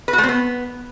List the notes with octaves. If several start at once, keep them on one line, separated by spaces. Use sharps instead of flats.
B4
F#4
A3
C4
B3